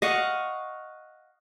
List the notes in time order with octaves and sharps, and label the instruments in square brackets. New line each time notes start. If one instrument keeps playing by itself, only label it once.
[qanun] D#5 F5 F#5 C#6